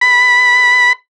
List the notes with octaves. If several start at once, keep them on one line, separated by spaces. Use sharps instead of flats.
B5